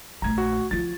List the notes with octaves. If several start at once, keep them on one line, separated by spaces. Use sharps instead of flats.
A#1 A3 A#5 G#6
F#4
F3 F4 A6